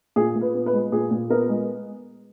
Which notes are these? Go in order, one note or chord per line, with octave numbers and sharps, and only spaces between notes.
A#2 G#4
A#2
B4
B3
B4
G#3
A#2 G#4
A#2
B3 A#4
G#3